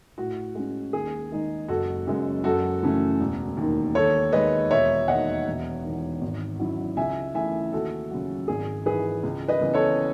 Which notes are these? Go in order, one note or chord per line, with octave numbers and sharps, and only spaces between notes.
A2 F#4
G#3 C#4
D#2 G#4
D#3 G#3 D#4
F#1 F#4 A4
F#2 C#3 G#3
F#2 F#4 A4
C#3 E3 A3 C#4
E1
D#2 D#3
D#2 A4 C#5
D#3 G#3 B4 D#5
E1 C#5 E5
D#2 D#3 D#5 F#5
E1
D#3
E2
G#1
G#2 F#3 C#4 E4
C#2 E5 G#5
C#3 E3 A3 E4 E5 G#5
D#2 F#4 A4
C#3 F#3
G#1 G#4
G#2 E3 G#4 B4
C#2
B4 D#5
C#3 E3 B3
A4 C#5